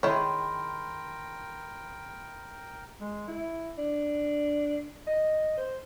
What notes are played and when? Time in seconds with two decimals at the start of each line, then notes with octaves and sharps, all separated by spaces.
0.03 D#3 E4 G#4 A#4 C#5 G5 B5 C6
3.01 G#3
3.28 E4
3.78 D4
5.07 D#5
5.57 C5